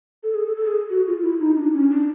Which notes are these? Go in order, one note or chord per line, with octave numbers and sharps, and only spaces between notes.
A4
G#4
A4
A4
G#4
F#4
F4
E4
D#4
D4
C#4
D4